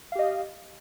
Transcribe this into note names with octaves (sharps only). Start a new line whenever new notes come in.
G4 D#5 F5